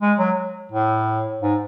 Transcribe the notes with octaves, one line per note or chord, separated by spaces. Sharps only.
G#3
F#3
A2
G#2